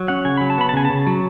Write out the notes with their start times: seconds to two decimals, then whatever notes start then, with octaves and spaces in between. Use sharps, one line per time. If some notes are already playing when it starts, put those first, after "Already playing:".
Already playing: F#3
0.08 C#4 F#5
0.25 C#3 G#5
0.37 F#3 B5
0.50 A5
0.58 B3 B5
0.69 A5
0.73 C#3 G#5
0.85 A5
0.90 C#3
1.07 F#3